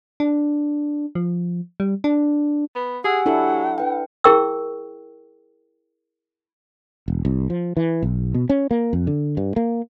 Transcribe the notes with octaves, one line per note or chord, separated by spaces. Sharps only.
D4
F3
G3
D4
B3
G4 G#4 F#5 G#5 E6
F#3 D4 E4 A4
D4 B4 G5
E4 G#4 A#4 G5 C#6 E6
E1
C2
F3
E3
B1
B2
C#4
A#3
F2
D3
G2
A#3